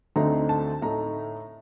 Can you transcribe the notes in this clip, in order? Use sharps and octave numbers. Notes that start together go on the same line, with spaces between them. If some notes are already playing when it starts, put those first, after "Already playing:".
D2 D3 A3 C4 D#4 A#5
A5
A2 A3 D#4 A#5